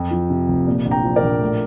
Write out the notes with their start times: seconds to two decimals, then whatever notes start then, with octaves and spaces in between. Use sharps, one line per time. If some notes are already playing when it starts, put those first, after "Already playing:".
Already playing: F2
0.11 F3
0.30 C3
0.48 F1
0.67 A#2
0.85 A#1
0.91 G5 A#5
1.04 F3
1.16 A#4 D5
1.22 A#1
1.41 A2